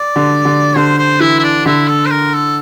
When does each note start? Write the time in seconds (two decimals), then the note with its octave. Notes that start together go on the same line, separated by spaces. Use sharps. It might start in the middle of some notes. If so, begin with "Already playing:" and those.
Already playing: D5
0.16 D3
0.45 D3
0.76 D3 C5
0.98 C5
1.20 E3 E4
1.39 E4
1.43 D4
1.66 D3 E4
1.88 A4
2.05 C5
2.10 A#4
2.34 A4